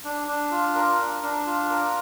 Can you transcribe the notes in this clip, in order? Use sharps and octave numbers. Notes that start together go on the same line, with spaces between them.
D4
D4
F4
A#4
D4
D4
F4
A#4